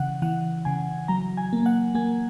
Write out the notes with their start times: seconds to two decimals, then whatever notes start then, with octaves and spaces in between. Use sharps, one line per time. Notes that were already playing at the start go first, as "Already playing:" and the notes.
Already playing: C#3 E3 F#5
0.22 E3 F#5
0.65 C#3 G#5
1.08 F#3 A#5
1.37 G#5
1.53 A#3
1.66 F#5
1.95 A#3 G#5